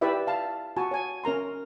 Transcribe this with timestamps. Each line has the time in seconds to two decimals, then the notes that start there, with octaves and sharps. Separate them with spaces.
0.01 E4 G4 B4 D5 E5
0.27 F5 A5
0.76 F#4 G#5 A5
0.91 C#5 G#5
1.24 C#4 A#4 A#5 C6